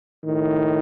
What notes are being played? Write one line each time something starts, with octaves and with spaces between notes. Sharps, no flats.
A2 D#3